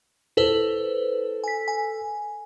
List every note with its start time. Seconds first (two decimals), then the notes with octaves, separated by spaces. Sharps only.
0.37 E4 A4 B4 C5
1.44 G#5 B6
1.68 G#5